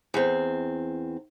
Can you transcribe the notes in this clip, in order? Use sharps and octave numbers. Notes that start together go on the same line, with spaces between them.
E2 C4